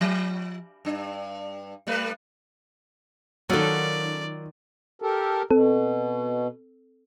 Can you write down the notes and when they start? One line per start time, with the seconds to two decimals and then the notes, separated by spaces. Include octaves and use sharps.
0.01 F3
0.85 G2 D4
1.87 G3 A3 B4
3.50 D#3 F#3 C#4 F4 A4 D5 F#5
5.02 G4 A4 A#4
5.51 B2 C4 A4